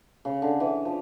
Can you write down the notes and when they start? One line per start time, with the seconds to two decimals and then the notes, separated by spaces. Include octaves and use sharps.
0.25 C#3
0.42 D3
0.60 E3
0.85 F3